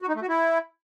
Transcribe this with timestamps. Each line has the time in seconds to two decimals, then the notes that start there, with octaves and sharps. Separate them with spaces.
0.02 F#4
0.09 D#4
0.15 A3
0.22 F#4
0.29 E4